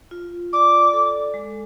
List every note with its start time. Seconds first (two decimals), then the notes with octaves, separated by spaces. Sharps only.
0.11 F4
0.53 D5 D6
0.93 A4
1.34 G#3